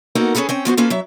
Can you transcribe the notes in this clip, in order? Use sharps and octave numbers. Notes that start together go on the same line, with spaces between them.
A#3 B3 D#4 F#4 A4 A#4
C#4 D4 G#4 A4 B4
C4 C#4 G5
F3 B3 F#4 C5
A#3 C#4 F4 A4 B4
F#3 E5